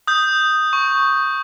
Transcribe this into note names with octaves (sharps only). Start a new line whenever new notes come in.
D#6 G6
C#6